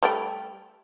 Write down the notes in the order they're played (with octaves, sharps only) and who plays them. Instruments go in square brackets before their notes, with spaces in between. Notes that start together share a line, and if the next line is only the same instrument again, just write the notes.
[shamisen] G3 A3 G5